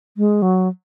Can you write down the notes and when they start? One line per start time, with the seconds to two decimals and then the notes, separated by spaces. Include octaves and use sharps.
0.17 G#3
0.42 F#3